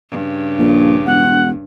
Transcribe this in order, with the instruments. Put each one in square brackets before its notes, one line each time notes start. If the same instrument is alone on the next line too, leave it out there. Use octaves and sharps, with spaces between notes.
[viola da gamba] G2 C#3
[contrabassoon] A#1
[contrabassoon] E1 [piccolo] F#5